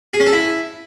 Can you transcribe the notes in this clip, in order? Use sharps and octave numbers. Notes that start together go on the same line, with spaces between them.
G#4
C#4
A4
E4